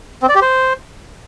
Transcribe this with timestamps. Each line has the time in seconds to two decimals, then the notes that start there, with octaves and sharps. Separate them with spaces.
0.22 C4
0.29 D5
0.35 G4
0.42 C5